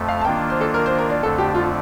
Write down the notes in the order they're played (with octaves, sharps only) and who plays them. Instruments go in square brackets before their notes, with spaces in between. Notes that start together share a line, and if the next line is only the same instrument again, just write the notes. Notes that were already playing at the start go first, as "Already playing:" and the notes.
Already playing: [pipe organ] F2 A3
[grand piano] F5
A5
[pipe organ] D#3 A#3 D4 F4 [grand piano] G5
[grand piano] A5
C5
A4
A#4
C5
A#4
D5
[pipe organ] F2 D3 A3 D4 [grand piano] A4
[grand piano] G4
F4